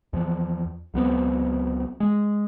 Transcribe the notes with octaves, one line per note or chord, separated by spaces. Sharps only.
E2 F3
C#2 F#3 B3 C4
G#3